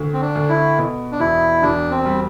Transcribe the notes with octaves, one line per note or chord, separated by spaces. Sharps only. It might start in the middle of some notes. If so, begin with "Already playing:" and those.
Already playing: D2
C4
D4
D2
E4
B2
D4
E1 E4
E1 D4
C4
G3